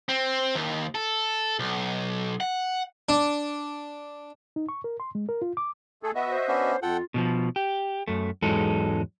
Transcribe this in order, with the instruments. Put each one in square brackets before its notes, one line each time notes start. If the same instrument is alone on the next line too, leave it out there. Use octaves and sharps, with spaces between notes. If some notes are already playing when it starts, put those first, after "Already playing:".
[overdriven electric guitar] C4
D#2
A4
B1
F#5
[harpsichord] D4
[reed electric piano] D#4
C#6
A#4
C6
G#3
A#4
F4
D6
[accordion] A3 G#4 A4
[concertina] B3 [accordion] F#4 D#5 E5
[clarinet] C5
[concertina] B3 C#4 D4
[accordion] F2 [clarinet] F4 [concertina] A4 F#5 G5
[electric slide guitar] B2 D#3 F3
G4
F#2 A3
E2 G#2 F#3 G#3 D#4 A4